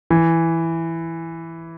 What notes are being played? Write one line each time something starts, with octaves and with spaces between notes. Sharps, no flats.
E3